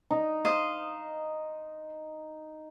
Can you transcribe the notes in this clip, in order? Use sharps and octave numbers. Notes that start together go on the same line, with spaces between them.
D#4
C5 D#5 F5